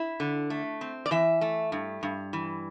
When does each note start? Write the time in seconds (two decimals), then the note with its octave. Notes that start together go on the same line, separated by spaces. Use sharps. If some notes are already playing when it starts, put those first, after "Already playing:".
Already playing: E4
0.20 D3
0.50 A3
0.81 C4
1.06 D5
1.11 E3 E5
1.41 A3
1.72 G2
2.03 G2
2.33 E3